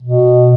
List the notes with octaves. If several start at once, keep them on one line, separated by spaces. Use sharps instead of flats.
B2